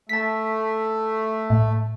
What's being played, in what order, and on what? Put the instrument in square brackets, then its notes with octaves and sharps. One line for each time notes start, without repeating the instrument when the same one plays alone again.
[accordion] A3 [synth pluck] A5 B6
[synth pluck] A2